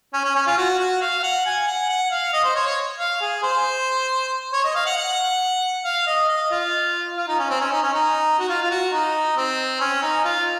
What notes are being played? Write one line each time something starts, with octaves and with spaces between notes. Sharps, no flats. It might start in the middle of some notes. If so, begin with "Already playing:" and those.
C#4
C#4
C#4
F4
F#4
F#4
F5
F#5
G#5
F#5
F#5
F5
D#5
C5
C#5
C#5
F5
G#4
C5
C#5
D#5
F5
F#5
F#5
F5
D#5
D#5
F4
F4
D#4
C#4
C4
C#4
D#4
C#4
D#4
F#4
F4
F4
F#4
D#4
C4
C#4
D#4
F4